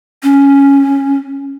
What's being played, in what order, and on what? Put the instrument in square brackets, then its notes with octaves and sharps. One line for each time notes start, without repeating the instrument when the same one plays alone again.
[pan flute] C#4